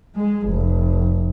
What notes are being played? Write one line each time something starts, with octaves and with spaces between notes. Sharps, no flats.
G#3
F1